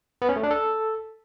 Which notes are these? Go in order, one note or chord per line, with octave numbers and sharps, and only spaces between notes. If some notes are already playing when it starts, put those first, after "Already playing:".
B3
C#4
A3
D4
A4